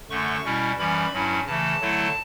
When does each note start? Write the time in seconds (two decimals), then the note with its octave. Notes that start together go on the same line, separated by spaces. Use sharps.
0.10 F#2 D3 A3 C#6
0.44 B2 G3 C#4 E4
0.78 F#2 E3 G3 C#4 B5
1.12 G2 F#3 C#4 E4
1.46 C#3 E3 A3 A5
1.81 D3 F#3 A3 E4